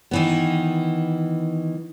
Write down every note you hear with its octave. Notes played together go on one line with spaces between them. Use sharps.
D#3 E3 B3